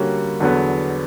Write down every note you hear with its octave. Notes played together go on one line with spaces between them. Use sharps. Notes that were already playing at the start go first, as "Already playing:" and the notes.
Already playing: D3 G3 A#3 C#4 F#4
E2 D3 F#3 B3